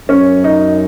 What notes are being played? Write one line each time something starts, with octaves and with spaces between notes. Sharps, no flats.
F#2 C#4
D#4